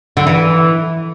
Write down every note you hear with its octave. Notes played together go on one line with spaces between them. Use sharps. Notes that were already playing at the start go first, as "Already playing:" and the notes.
D3
E3